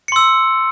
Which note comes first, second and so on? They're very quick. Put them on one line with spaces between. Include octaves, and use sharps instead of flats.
C#7 C6 E6